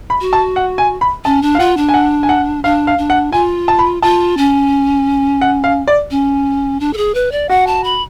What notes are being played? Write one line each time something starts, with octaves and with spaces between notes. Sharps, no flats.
B5
F#4
A5
F#5
G#5
B5
C#4 A5
D4
F5
F4 F#5
D4
G#5
F#5
G#5
F#5
D4 F5
F5
D4
F#5
F4 G#5
A5
B5
F4 A5
C#4
F#5
F5
D5
C#4
D4
A4
G#4
B4
D5
F#4 F#5
A5
B5